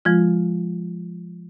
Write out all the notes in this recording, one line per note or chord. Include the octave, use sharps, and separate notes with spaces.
F3 G#3 F4